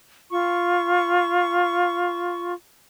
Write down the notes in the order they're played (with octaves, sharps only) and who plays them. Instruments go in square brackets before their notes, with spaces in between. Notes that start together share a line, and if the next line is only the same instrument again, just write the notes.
[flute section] F4 C#6